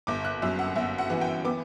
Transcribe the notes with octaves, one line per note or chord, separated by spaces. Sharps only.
G1 D6
F#6
F#2 E6
F#5
G1 E5
F#5
E3
G5
B3 D6